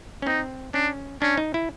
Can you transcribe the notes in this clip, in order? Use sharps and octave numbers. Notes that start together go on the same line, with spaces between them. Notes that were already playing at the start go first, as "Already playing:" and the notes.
C#4
C4 D#4
C#4 D4
C#4 D4
D#4
E4